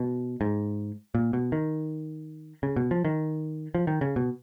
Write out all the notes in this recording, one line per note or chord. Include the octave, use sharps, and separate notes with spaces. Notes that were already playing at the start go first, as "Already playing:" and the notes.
Already playing: B2
G#2
A#2
B2
D#3
C#3
B2
F3
D#3
F3
D#3
C#3
B2